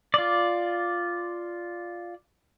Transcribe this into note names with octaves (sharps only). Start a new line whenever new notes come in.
F4 D5